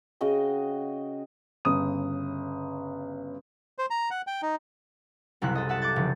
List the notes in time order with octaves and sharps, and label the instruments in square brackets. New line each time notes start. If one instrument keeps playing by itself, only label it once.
[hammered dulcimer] C#3 F#4 D#5 G5
[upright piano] G1 C#3 D#6
[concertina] C5
A#5
F#5
G5
D#4
[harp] F#1 C2 C3 E4 F#6
A4 D#5
E5 F#5 A5
D6 F#6 G6 A6
F1 C#3